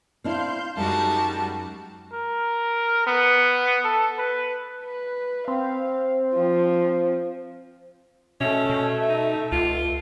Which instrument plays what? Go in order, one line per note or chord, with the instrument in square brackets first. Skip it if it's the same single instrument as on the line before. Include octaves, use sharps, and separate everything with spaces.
[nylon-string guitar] C4 D4 E4 [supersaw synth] F5 C6 G6
[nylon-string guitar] F#2 [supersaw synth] G3 [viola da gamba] G#3 D#4 F#4 [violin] A5
[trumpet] A#4
B3
A4
B4
[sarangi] B4
[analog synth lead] C4 [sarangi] F5
[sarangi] F3
[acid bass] B2 [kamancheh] A3 E5 [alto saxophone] C#4
[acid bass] B2
[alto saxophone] D#4
[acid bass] C#2 [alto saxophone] F4